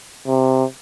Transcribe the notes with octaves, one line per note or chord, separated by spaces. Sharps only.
C3